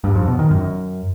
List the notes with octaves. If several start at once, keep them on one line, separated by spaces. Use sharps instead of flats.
G2
F2
B2
D#3
F#2